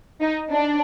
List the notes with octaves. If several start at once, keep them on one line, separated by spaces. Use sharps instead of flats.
D#4
D4